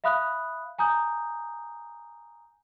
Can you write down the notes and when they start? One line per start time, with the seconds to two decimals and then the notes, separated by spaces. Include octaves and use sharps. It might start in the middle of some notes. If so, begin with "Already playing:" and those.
0.04 E5 F5 B5 D#6 F#6
0.79 G#5 A#5 D#6 G6